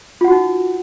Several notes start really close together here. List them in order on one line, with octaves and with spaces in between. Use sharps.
F4 F#5 F#4 D#4